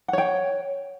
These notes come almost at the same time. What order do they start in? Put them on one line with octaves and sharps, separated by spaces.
F#5 C#5 G5